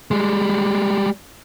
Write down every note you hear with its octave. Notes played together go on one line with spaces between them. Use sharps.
G3 G#3